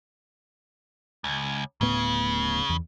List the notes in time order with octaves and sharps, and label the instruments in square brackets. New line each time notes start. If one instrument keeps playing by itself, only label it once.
[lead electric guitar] C#2
[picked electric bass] D1 A2 B3 [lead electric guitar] C#3
[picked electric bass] E2